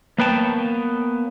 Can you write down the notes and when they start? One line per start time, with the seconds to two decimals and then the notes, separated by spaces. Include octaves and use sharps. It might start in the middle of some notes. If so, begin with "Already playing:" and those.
0.18 A#3 B3 B4 C#5 G5 A5